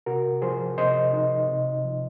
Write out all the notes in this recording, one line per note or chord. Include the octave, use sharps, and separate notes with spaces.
C3 F#4 A#4
F3 G#4 C5
C3 C5 D#5
D#4
C3
F3